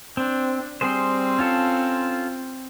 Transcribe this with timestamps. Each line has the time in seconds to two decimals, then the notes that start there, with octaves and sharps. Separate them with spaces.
0.17 C4 D4
0.81 G3 C4 G#4 C5
1.39 C#4 F4 A4